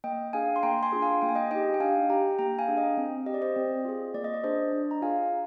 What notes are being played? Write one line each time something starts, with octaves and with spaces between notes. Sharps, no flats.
A#3 D#5 G5
D4 G#4 F5 G#5
C6
A#3 G5 A#5
G#5 C6
D4 F4 G#4
F5 G#5
A#3 G5
G#5
D#5 G5
D#4 G4 D#5 G5
G5
D4 F5 G#5
G4 G5 A#5
A#3 G5 A#5
F5 G#5
D4 G#4
D#5 G5
C4
G4 D#5
D5
C5 D#5
C4
F4 G#4
A#3 D5
D#5
D5
D4 G#4 C5 D#5
D4
A#5
F4 G#4 F5 G#5